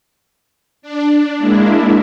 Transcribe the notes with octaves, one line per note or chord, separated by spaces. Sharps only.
D4
G#3 A#3 D4 E4